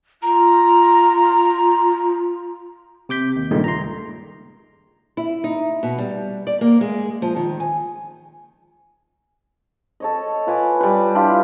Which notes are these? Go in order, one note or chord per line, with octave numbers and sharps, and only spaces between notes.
F4 A#5
C3 D6 G6 B6
D#2
C#2 G2 A#2 D#3 G#3 A3
A#5 C6
E4
D#4
B2
G3
D5
A#3
G#3
F3
D#3
G#5
A4 C#5 D#5
F4 B4 G#5 D6
G3 B4
D4 E4 F4 G4